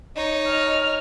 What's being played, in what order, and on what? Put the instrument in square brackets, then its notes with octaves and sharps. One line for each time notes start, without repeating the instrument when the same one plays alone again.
[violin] D#4 C#5 [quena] D#5
[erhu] F6